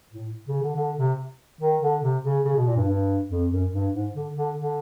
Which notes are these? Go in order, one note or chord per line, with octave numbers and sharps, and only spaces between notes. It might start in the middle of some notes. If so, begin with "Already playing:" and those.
A2
C#3
D3
D3
C3
D#3
D3
C3
C#3
C#3
B2
A#2
G2
G2
F2
F#2
G2
G#2
D3
D3
D3